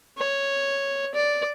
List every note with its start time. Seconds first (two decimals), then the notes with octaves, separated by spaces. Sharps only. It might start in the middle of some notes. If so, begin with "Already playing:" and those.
0.17 C#5
1.14 D5